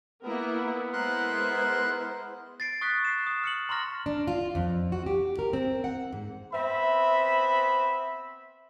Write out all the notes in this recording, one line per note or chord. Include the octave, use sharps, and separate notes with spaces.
A#3 B3 E4 A#4
G#3 E4 A#4 C5 C6 F#6
A6 C7 D7
C#6 D#6 F#6 B6
C7 E7
D#6
F6 C#7 F#7
A#5 C6 C#6 F6 A#6
D4
F4
F2
F#4
G4
A#4
C4
F#5
G#2
B3 C4 E5 B5